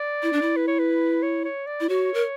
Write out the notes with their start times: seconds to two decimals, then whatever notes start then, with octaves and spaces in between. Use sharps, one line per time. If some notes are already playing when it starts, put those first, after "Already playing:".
Already playing: D5
0.23 E4
0.33 D4
0.42 E4
0.57 B4
0.67 C#5
0.79 B4
1.22 C#5
1.44 C#5
1.67 D5
1.80 E4
1.89 F#4 C#5
2.14 A#4